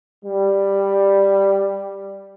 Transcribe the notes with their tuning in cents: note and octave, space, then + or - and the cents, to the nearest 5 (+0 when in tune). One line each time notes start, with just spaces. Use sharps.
G3 +5